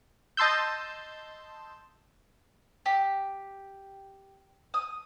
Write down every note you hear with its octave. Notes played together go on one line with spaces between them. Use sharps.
D#5 A5 C6 E6 G6
G4
D#6